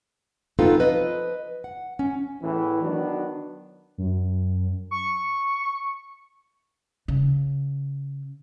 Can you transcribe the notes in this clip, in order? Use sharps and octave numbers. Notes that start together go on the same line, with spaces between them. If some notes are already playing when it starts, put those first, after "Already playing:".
B3 C4 D#4 F4 A4 B4
F3 B4 D#5
F#5
C#4
E2 A2 E3
D#3 F#3 B3 D4 F#4
F#2
C#6
C#3